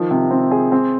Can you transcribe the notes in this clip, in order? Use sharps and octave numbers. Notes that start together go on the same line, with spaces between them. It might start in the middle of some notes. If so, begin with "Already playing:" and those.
Already playing: D#3 F3
C3
C4
G#4
C4